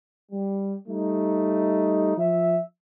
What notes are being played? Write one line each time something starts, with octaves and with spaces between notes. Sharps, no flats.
G3
G3 A3 D#4
F3 E5